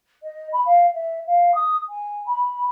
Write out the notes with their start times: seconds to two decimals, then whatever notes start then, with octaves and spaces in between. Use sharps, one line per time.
0.22 D#5
0.52 B5
0.65 F5
0.93 E5
1.27 F5
1.54 D#6
1.89 G#5
2.26 B5